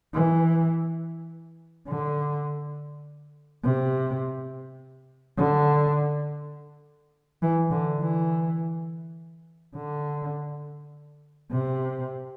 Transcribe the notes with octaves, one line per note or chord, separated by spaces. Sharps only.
E3
D3
C3
D3
E3
D3
E3
D3
C3